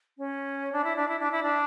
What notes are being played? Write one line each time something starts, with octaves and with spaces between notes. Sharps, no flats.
C#4
D4
E4
D4
E4
D4
E4
D4